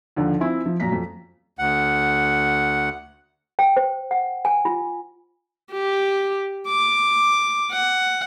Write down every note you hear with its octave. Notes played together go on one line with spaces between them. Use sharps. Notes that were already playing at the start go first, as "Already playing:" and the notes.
D#2 D3 F3
C4 E4 F4 E5 G#5
F3
F#2 A#2 A#5 B6
F2
D2 F#5
G5
C5
F#5
G#5
F4
G4
D6
F#5